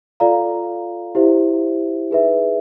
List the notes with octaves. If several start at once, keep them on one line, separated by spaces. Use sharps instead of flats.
F4 A4 D5 F5 A#5
E4 G4 C5 E5
D#4 G#4 B4 E5